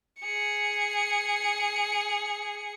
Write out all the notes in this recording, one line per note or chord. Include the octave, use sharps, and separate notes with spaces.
G#4 C#7